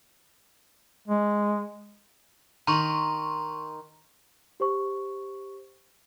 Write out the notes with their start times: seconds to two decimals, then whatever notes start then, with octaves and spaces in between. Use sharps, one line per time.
1.08 G#3
2.67 D#3 A#5 C6 C#6
4.60 G4 C5 C#6